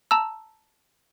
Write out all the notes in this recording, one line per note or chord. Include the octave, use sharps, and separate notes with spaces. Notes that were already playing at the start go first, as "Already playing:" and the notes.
A5 A#5 E6